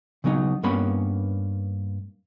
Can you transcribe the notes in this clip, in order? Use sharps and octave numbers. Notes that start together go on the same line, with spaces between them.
C#3 F#3 B3 D#4
G2 A#3 B3 C#4 C#5 B5